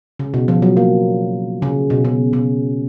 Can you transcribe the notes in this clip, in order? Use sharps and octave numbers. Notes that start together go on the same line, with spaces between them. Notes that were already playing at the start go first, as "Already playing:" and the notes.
C#3
B2
F3
F#3
A#3
C#3
B2
C#3
C#3